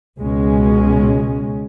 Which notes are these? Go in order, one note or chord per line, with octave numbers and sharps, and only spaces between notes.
C#2 B2 G#3 C#4